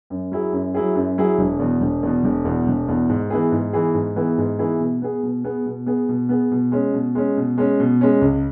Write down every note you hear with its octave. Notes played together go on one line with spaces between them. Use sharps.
F#2
F#3 E4 G#4
F#2
F#3 E4 G#4
F#2
F#3 E4 G#4
E1
E2 B2
E1
E2 B2
E1
E2 B2
E1
E2 B2
G#2
E3 B3 E4 G#4
G#2
E3 B3 E4 G#4
G#2
E3 B3 E4 G#4
G#2
E3 B3 E4 G#4
B2
B3 G#4
B2
B3 G#4
B2
B3 G#4
B2
B3 G#4
B2
G#3 C#4
B2
G#3 C#4
B2
G#3 C#4
B2
G#3 C#4
C#2